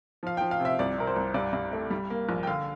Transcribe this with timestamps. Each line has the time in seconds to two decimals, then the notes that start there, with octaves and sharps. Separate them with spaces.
0.23 F3 F5
0.37 G5
0.41 F3
0.51 F5
0.59 C3
0.65 E5
0.79 C2 D5
0.98 C3 A#4
1.07 C5
1.16 C2
1.34 G2 D5
1.53 G2
1.73 A3
1.90 G3
2.10 A#3
2.29 A#1
2.43 G5
2.47 D3 F5